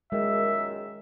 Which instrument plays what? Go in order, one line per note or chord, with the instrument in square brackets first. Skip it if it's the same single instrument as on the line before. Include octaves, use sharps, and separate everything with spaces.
[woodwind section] F#2 A#2 D#3 [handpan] G#3 [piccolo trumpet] E5